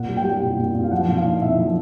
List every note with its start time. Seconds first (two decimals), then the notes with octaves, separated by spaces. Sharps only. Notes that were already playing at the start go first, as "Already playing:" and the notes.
Already playing: A#2 F#5
0.08 G3
0.17 G5
0.24 G3
0.42 A#2
0.59 A#2
0.75 A#2
0.84 F5
0.91 F3 F#5
1.08 A#2
1.17 F5
1.26 D#4
1.42 A#2 E5
1.58 F3